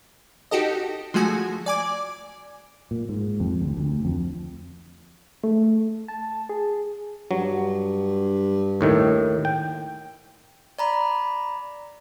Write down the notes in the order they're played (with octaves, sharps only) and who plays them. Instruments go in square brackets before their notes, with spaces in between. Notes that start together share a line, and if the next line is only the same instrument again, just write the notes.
[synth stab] D#4 F#4 G4 A4 D#5
F3 G#3 A3 F#4 G#5
D5 G#5 D6
[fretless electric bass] A#2
G#2
F2
D2
D2
F2
[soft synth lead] A3
A5
G#4
[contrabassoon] G2 [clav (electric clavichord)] F#3
[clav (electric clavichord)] D#2 A2 D#3
G5
[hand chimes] D5 A#5 B5